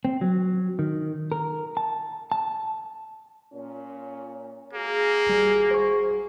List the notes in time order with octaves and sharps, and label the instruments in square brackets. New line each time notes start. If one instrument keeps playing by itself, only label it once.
[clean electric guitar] C4
F#3
D#3
A#4
A5
A5
[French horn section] A#2 C#4
[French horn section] G#3 F#4 G#4 [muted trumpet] A#3
[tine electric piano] G#1 G3
C5 C#6